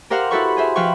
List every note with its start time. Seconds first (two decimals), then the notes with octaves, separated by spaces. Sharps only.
0.10 G4 A#4 C5 F5 F#5
0.31 E4 F#4 A4 B4 C5 C#6
0.57 G#4 C5 E5
0.76 F3 B4 F5 G5 C#6